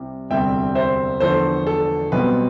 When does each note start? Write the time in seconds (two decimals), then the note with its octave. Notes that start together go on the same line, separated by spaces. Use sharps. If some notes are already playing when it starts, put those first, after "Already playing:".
Already playing: C2 C3 G3
0.30 E1 D2 C3 G3 C4 E5 G5
0.75 C5 E5
1.20 E1 E2 D3 F3 A3 A4 C5
1.67 A4
2.12 B1 B2 G3 C4 B4